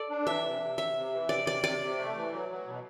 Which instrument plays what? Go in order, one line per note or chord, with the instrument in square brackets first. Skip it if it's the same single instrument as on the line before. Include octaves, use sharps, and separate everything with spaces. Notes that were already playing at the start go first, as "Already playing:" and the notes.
Already playing: [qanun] A4 D5
[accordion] D4
[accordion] E3 [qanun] E5
[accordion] C3
C3
[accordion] C3 [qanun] E5
[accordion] C3
E3
[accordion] C3 [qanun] D5
[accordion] C3 [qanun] D5
[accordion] C3 [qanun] D5
[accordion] C3
A3
E3
F#3
F#3
B2